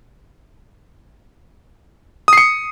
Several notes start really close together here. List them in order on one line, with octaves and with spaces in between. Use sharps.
D#6 C7 C#7